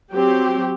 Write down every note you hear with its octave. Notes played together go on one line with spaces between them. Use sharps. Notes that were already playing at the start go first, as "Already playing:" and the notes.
F#3 C4 G4